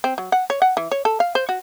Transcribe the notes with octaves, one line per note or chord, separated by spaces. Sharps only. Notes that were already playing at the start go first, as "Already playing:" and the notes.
C4
F#3
F#5
C#5
F#5
E3
C#5
A4
F5
C5
F#4